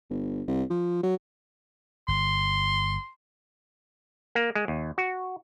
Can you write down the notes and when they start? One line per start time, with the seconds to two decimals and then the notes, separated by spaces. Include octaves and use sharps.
0.10 G1
0.47 C2
0.70 F3
1.03 F#3
2.08 G1 C6
4.35 A#3
4.55 G#3
4.68 D#2
4.98 F#4